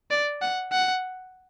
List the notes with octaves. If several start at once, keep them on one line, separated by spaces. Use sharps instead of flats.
D5
F#5
F#5